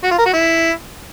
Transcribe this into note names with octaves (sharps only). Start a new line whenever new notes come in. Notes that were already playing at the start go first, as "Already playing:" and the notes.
F#4
F4
A#4
F#4
E4